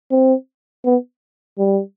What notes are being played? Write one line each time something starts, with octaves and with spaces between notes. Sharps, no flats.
C4
B3
G3